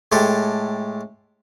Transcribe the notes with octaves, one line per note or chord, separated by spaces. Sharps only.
A2 G#3 G4 A4